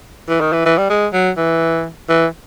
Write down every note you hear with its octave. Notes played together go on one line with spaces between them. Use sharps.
E3
D#3
E3
E3
G3
G#3
F#3
E3
E3